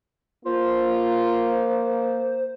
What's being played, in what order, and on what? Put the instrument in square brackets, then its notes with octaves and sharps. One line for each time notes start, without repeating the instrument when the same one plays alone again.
[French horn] A#3 [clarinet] F4 [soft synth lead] C5